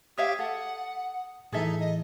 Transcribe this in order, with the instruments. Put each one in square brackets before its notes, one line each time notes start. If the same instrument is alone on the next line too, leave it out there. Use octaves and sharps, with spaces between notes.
[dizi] G4 [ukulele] C#5 E5 F5 [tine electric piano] D#6
[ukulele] A4 [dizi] F#5
[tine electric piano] A2 E3 [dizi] D#4 [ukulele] G#4 A4 E5
[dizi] D#5